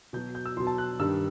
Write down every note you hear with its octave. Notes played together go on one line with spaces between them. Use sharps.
B2 F#3 G6
G6
E6
B2 F#3 C6
A5
F#6
G2 D#3 G3 E6